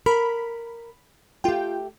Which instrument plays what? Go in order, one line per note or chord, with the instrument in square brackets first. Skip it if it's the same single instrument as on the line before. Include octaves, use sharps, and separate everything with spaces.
[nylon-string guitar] A#4 [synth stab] B5
[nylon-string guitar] A3 G4 [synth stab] F4 G5